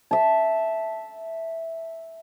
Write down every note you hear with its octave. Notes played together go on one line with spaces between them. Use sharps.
E5 A5